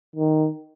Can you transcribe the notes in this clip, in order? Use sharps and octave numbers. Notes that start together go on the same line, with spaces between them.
D#3